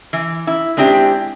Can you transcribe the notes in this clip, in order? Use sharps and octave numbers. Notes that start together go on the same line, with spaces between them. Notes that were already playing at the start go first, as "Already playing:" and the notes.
E3
E4
G#3 C4 D4 E4 G4